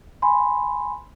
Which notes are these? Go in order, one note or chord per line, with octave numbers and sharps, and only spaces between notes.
G#5 B5 C6